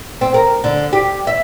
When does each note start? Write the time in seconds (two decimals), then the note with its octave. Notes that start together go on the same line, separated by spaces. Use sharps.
0.21 C4
0.34 A#4
0.64 D3
0.93 G4
1.27 E5